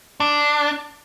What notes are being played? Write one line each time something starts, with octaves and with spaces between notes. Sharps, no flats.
D4